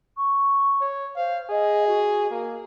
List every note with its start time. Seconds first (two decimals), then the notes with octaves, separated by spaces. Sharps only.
0.17 C#6
0.81 C#5
1.16 C5 F5
1.50 G#4 D#5
1.87 F#4
2.31 A#3